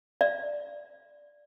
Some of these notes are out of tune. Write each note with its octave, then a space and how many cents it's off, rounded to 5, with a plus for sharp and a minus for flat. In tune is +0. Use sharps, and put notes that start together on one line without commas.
D5 +0 F5 -45